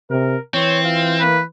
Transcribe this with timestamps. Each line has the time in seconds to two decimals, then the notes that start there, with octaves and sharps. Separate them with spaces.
0.10 C3 A#4
0.54 E3 C4 C#5
0.85 F4
1.21 A#3 B4